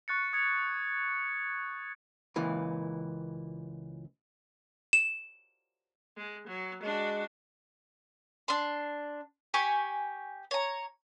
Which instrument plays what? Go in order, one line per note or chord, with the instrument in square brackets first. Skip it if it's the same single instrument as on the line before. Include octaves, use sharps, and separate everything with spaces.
[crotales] C#6 F#6 A6 C#7
D#6 G#6 C#7
[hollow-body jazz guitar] C#2 A#2 E3
[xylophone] E7
[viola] G#3
F#3
[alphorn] G#3 [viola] D4 F#4
[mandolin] D4 C6
G4 G#5 B5 C#6
C#5 A#5